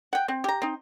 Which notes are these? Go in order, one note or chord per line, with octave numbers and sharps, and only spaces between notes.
F#5 G5
C4
G4 A#5
C4 D#4